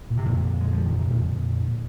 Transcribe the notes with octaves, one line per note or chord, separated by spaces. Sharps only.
A#2
C3
F2 A#2
G#3
F3
D#3
C3
F2 A#2